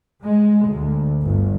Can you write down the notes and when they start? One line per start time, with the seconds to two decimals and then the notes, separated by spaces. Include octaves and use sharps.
0.23 G#3
0.67 D2
1.21 G1